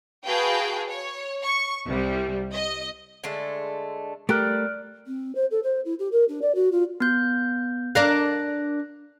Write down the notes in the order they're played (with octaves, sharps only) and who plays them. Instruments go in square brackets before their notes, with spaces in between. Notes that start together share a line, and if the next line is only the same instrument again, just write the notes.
[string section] F#4 G#4 B4 F5 G5 A5
C#5
C#6 C#7
C2 G3
D#5
[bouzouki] D3 G#3 A3
[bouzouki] G3 [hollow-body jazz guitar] A3 G4 A#4 [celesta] F6 F#6 D7
[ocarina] C4
C5
A4
C5
E4
G4
A#4
D4
D5
F#4
F4
[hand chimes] B3 G6
[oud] D4 A#4 F5 [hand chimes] F#6 A#6